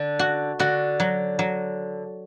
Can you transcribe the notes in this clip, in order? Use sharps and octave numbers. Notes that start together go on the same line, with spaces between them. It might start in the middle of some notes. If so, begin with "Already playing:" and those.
Already playing: D3
F#4
D3 F#4
F#3
F#3